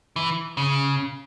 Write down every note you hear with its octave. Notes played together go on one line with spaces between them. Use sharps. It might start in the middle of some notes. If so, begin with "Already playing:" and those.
E3
C#3